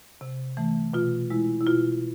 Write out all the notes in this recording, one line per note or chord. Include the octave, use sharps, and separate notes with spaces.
C3
E3 A3
B2 F4
G#3 E4
E4
B2 F4